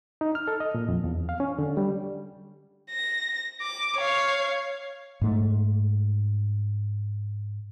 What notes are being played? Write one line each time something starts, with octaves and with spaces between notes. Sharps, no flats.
D#4
F6
A4
D#5
A#2
F2
E2
F5
C#4
D3
G3
A#6
D6
C#5 F5
G#2 A3